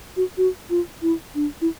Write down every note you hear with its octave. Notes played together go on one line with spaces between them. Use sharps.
F#4
F#4
F4
E4
D4
E4